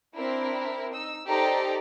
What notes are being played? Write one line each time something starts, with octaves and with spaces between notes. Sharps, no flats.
C4 D4 E4 A#4
D#4 E6
D#4 G4 A4 C5 D5 A#5